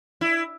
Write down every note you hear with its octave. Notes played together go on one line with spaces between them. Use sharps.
E4